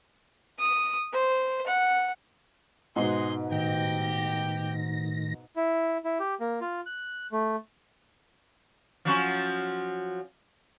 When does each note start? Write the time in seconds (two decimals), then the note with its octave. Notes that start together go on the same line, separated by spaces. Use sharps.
0.59 D#6
1.13 C5
1.67 F#5
2.96 G#2 B2 D#4 G#4 D#5 F#5 C6
3.51 A2 D#3 G4 G5 A#6
5.56 E4
6.04 E4
6.20 G4
6.40 A#3
6.61 F4
6.86 F#6
7.32 A3
9.05 F3 F#3 C#4